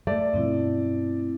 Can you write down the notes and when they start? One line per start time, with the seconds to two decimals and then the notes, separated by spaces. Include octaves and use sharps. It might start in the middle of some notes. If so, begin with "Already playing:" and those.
0.07 A3 D5
0.34 G2 B2 F3 C4 E4